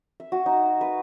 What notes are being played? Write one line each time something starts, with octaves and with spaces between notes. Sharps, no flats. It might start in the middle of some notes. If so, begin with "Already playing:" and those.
E5
F#4
D#4
B4